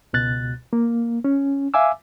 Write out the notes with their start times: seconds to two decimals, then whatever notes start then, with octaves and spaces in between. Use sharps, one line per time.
0.13 C#2 B2 F#6 A6
0.73 A#3
1.24 C#4
1.74 E5 F5 G#5 D6 E6